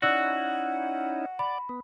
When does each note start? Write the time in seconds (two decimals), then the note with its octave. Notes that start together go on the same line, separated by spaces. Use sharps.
0.02 C#4 D#4 E4 F#4 D5 F#5 E6 F#6
1.39 D5 B5
1.69 B3